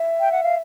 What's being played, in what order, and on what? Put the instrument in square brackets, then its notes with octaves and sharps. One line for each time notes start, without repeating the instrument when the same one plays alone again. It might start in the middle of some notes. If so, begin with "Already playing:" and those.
Already playing: [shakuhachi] E5
[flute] G5
F#5
F5